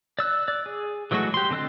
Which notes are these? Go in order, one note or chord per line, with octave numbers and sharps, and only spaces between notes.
D5 E6 F#6
D5
G#4
E3 F#3 G#3 A3 F#4
G4 C6
D3 C4 A4 D#5 F#6